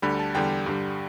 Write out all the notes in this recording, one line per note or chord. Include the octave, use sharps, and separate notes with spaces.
D2 D3 G3 B5
A5
E2 D3 G3 G5
G2 D3 G3